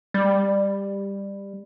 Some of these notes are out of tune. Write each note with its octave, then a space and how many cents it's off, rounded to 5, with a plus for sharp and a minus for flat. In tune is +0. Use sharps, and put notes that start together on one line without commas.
G3 +15